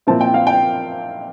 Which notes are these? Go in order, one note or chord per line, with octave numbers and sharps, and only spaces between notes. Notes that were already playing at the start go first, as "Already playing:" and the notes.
A#2 F3 C4 E4 A5
G5
F5
G5